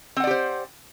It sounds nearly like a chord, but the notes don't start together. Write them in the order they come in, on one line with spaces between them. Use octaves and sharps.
C4 F#5 D5 G4 C5